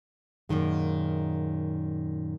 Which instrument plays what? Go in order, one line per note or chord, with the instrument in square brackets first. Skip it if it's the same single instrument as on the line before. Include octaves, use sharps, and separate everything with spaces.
[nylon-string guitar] F#2 A#2 D#3 G#3